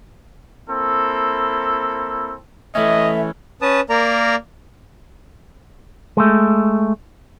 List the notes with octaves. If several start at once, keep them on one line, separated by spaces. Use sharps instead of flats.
A#3 C4 E4 A4
E3 A3 C#4 D#5 E5
C#4 B4 A5 D#6
A#3 A#4 D5 A#5
G#3 A3